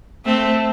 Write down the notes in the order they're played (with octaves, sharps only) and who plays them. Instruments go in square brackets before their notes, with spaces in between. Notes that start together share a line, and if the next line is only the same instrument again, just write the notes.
[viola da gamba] A3 C4